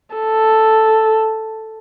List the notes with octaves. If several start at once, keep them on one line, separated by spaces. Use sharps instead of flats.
A4